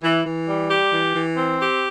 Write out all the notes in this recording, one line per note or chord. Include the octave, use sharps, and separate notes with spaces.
E3
E3
G3
G4
E3
E3
C4
G4